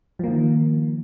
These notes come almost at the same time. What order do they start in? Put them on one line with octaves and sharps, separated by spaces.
F3 A#3 D#3